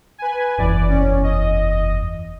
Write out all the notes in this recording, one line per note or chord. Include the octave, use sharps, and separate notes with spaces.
B4 G#5
F#1 E2 D5
C#4
D#5